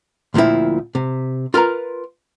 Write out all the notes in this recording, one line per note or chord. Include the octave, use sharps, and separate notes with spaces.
D2 A#2 F3 C4 E4
C3
F4 A#4 B4 A#5